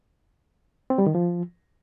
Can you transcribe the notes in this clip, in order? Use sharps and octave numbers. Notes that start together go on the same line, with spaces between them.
C4
G3
D#3
F3